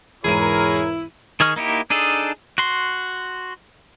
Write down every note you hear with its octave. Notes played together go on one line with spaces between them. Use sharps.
E1 G#2 E4 G#4 A#4 C#5 D#7
D#3 G#4 D#5 C#6 F6
A#3 D#4 E4 G4
D4 D#4 G#4 A4
F#4 C6